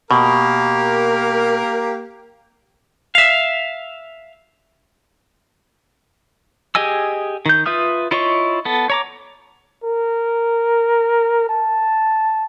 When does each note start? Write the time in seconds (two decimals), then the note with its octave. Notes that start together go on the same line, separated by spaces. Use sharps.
0.11 B2 A#3 G4 A#4
3.15 E5 F5
6.75 G4 G#4 D#5 G#5 E6
7.46 D#3 G6
7.66 F4 B4 E5 D#6 F6
8.11 E4 F4 C#5 D#5 C#6
8.65 B3 A4
8.90 C#5 A#5 D6
9.84 A#4
11.49 A5